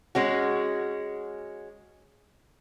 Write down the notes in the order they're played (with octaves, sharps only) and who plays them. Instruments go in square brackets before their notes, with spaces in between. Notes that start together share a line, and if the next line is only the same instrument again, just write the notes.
[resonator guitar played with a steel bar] G#3 C#4 F#4